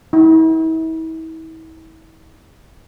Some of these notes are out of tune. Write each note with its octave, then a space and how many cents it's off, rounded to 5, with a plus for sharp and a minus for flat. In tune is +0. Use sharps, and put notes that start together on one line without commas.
E4 -40